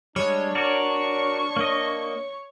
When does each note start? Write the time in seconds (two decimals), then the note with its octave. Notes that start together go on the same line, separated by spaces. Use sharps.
0.16 G3 G#3 D4 C#5
0.55 F#4 A#4 D5 C#6
1.57 A#3 D#5